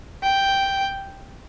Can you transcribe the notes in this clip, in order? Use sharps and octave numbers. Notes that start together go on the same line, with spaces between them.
G5